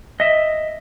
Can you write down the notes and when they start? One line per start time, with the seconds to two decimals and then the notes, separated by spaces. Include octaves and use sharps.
0.20 D#5 E5